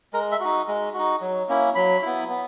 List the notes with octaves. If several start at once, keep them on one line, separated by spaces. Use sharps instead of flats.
G#3 A#4
E5
D#4 F#4
G#3
D#4 F#4
F#3
A#3 C#4 E4
F#3 B5
B3 E4
B3